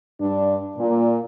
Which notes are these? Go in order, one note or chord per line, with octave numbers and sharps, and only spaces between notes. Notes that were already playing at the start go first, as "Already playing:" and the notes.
G2 D4
A#2